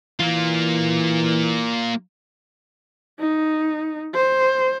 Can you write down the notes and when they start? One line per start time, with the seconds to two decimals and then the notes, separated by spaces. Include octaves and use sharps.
0.19 E3 A#3 F4
3.20 D#4
4.14 C5